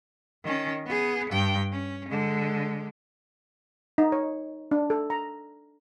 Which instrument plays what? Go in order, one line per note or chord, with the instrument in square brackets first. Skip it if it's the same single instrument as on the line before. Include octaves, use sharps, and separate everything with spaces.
[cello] D#3 C#4
B3 G#4
G2 G5
C#4
D3 G#3
[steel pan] D#4
C#5
D4
A4
A#5